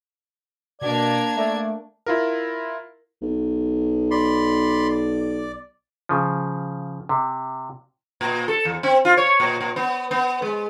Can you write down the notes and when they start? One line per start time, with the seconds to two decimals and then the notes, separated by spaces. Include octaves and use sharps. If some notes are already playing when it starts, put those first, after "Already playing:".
0.81 B2 A#3 D4 D5 G#6
1.36 A3 D5
2.06 E4 F4 A#4
3.22 B1
4.11 D5 B5 C6
4.89 D5
6.09 C#3 F3
7.09 C3
8.21 A#2
8.48 A4
8.65 E2
8.83 C4
9.05 F4
9.17 C#5
9.40 A#2
9.61 A#2
9.76 B3
10.11 B3
10.42 G#3